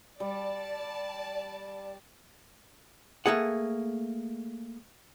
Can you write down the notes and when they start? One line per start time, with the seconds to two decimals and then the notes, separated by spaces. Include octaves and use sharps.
0.20 G3 D5 A5
3.26 A3 A#3 G#4 F#5